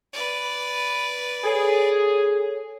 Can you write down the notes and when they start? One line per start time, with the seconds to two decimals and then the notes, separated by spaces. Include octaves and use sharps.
0.13 B4 D5
1.44 G#4 A4 C#5